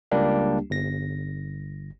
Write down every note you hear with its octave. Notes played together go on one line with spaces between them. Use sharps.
C#2 G3 A#3 D4 G4
G1 A#6